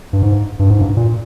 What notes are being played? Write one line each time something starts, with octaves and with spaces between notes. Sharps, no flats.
G2
G#2
G2
G#2
G2
A#2